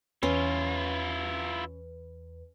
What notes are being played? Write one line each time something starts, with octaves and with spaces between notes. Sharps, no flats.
E2 C#4 E4 F4 B4